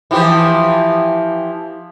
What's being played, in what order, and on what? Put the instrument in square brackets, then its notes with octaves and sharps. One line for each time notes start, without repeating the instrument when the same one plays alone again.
[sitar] E3 F3 G4